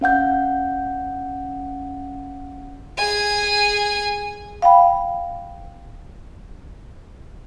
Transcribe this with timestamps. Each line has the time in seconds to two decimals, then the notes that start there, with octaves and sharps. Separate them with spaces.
0.01 C#4 F5 F#5 G6
2.98 G#4 G#5
4.62 F5 G5 B5